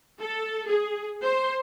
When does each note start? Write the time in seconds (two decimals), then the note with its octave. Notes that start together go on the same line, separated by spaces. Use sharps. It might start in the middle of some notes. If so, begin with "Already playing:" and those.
0.20 A4
0.68 G#4
1.23 C5